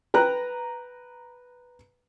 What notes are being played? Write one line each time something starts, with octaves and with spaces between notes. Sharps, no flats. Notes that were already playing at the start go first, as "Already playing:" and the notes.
B4 G5 A#5 F#6